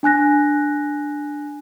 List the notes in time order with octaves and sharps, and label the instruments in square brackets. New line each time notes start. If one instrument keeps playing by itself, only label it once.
[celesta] D4 G#5 F#6 A#6